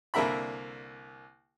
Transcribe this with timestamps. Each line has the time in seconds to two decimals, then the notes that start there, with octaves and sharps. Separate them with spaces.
0.14 C2 D3 A#3 A#4 E5 B5